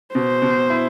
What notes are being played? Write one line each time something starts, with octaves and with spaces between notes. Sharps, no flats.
B2 C5
B2
E4